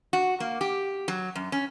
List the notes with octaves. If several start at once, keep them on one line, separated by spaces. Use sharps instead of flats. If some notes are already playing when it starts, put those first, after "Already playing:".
F#4
A#3
G4
F#3
F#2
C#4